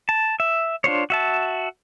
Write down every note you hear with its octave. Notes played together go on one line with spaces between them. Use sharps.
A5
E5
D4 F4 C5 C#5
F#4 E5 A5